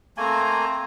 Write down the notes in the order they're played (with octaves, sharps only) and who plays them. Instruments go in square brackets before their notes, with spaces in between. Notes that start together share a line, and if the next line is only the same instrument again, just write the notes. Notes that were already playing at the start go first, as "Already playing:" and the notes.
[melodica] A3 A#3 G#5 [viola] C4 A#5